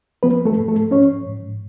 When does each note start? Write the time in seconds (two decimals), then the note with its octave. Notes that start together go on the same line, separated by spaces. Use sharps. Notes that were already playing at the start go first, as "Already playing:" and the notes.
0.23 F3 B3 B4
0.45 A3 A4
0.57 G#2
0.68 A3 A4
0.91 F3 C#4 C#5
1.25 G#2